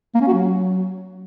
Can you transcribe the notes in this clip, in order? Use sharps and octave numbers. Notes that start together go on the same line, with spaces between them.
A#3
C#4
F#4
F#3